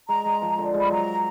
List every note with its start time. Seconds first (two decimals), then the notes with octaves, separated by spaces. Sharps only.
0.09 G#3 A#5
0.25 G#3
0.42 F3
0.58 D3
0.74 G#3
0.80 B5
0.91 F#3 A#5